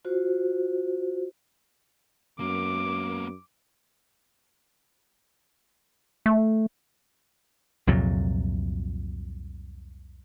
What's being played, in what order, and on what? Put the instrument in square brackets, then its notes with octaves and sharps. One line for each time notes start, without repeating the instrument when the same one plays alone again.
[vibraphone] F4 F#4 C5
[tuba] F#2 [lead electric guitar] A#3 B3 [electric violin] D6
[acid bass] A3
[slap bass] C2 F2 A#2 F#3